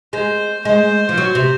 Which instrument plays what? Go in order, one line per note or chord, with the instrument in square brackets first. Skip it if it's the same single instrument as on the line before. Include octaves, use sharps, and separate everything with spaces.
[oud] G#3 [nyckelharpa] C5
[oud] G#3 [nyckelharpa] C5
[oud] F3
F#3
C3